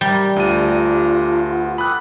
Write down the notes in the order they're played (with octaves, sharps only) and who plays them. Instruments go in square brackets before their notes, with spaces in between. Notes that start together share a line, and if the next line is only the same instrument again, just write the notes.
[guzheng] G3 [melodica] A#4
[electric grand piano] D2 D#7 [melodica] D4 A#5 [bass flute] F4
[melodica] B3
[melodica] G4 A4 D#6 [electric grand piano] B5 F#6